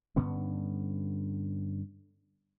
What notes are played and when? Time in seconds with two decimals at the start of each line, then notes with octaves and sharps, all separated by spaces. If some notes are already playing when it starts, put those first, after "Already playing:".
0.16 G2 D3 B3 C#4